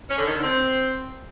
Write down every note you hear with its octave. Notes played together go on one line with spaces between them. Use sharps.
C#4
D3
D#3
D3
C4